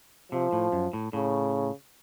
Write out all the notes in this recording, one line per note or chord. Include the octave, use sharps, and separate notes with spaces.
C3 F3
A2
F#2
A2
A2 C#3